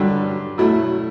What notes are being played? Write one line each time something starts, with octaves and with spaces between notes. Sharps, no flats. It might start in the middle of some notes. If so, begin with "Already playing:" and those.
Already playing: G2 D3 F#3
B2 F#3 A3 E4